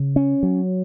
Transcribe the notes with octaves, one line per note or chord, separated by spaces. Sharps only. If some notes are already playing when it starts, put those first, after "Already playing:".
Already playing: C#3
C#4
F#3